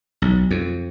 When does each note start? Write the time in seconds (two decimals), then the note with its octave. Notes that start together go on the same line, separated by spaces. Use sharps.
0.22 B1
0.51 F2